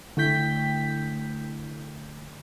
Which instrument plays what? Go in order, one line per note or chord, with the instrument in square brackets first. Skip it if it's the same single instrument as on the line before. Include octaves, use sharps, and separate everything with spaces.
[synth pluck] D3 A3 E4 G5 G6 B6